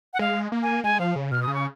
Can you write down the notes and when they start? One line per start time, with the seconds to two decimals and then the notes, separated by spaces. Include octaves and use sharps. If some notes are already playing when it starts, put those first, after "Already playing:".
0.13 F#5
0.19 G#3 F5
0.52 A#3
0.62 G#5
0.84 G#3 G#5
1.00 F3 F5
1.16 C#3
1.31 B2 F6
1.42 D#6
1.47 C#3
1.54 C#6